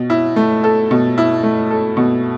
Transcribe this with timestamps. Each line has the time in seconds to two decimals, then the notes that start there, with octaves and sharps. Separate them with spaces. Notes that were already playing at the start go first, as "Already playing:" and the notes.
Already playing: B2
0.10 E4
0.36 A3
0.64 A4
0.91 B2
1.18 E4
1.43 A3
1.70 A4
1.97 B2